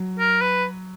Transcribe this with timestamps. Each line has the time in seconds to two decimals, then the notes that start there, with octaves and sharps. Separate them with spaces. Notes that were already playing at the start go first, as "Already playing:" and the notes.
Already playing: F#3
0.19 A#4
0.41 B4